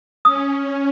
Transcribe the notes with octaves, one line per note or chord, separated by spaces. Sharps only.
C#4 D#6